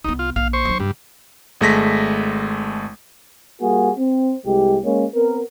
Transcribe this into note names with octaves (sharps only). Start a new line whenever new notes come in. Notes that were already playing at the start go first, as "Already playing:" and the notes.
C2 B3 D#4
F4
A#1 F5
C5 C#6
F#3 D4
G2 C#3
G#1 G#3 A3 A#6 B6
G3 A#3 F#4 G#4
C4
C2 G#3 G4
G#3 A#3 C#4
B3 C4 A#4